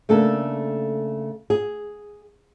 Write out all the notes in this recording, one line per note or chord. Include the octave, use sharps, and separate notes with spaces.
C#3 A3 A#3 D4 A4
G#4